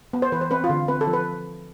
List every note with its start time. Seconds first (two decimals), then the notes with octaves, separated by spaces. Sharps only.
0.13 B3
0.22 C5
0.32 E3 B4
0.41 C5
0.51 C4 B4
0.64 F4
0.69 D3
0.88 C4 B4
1.01 A4
1.07 F3
1.13 B4